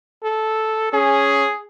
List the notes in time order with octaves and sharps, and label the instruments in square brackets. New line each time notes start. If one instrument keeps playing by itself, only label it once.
[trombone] A4
[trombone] C#4 [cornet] G#4